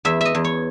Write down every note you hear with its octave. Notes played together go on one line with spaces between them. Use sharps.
E2 E5
D#5 E5
E2
C#5